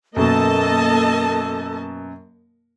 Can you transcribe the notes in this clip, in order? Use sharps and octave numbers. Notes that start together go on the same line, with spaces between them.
F#2 B2 A#3 A4 D#5 A5